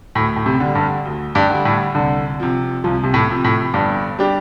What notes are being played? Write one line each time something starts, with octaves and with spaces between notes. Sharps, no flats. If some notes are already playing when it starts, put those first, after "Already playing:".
D2 A2
A2
C3
D3 G3
G2
D2
G2
D3 G3
A2
C2 D3
C3 F3
C2 F3
C3
A2
C3 F3
A2
G1 G2
G3 D4 G4